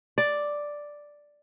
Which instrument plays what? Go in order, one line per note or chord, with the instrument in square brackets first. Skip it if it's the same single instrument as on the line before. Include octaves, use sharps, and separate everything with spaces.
[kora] D5